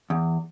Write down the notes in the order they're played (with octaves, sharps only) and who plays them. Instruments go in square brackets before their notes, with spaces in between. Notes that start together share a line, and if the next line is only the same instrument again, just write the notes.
[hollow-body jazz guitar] E2